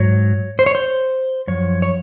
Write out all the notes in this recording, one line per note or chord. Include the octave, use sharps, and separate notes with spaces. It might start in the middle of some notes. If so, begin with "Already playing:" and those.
Already playing: G#2 F#3 C#5
C5
C#5
C5
F#2 F3 C#5
C#5